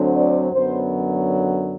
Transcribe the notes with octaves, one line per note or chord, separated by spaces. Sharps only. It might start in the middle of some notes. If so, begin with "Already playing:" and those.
Already playing: D2 D3 F#3 C4
D5
F#2 D3 F#3 B3 C5